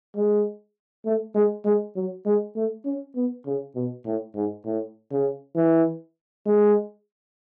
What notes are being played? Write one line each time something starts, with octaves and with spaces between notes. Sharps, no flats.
G#3
A3
G#3
G#3
F#3
G#3
A3
C#4
B3
C#3
B2
A2
G#2
A2
C#3
E3
G#3